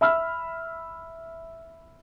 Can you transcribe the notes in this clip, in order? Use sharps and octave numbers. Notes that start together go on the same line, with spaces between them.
E5 B5 E6 F6